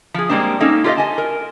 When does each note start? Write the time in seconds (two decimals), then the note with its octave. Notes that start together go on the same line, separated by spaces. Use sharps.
0.14 F3 G#4
0.29 G3 G#3 A#3 C4 D4
0.60 A#3 C#4 D#4 A4
0.84 F4 G4 A#4 D5 D#5 F5
0.97 D#5 G#5 A5
1.18 A#4